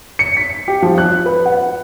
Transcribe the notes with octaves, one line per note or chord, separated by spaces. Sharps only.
C#7
B6
G4
F3
F#6
B4
F#5